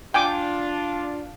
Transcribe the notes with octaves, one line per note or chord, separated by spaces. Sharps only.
D4 F4 G5 G#5 D6